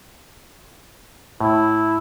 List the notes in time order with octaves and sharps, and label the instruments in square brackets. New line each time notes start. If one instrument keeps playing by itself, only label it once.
[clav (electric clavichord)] A2 [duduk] E4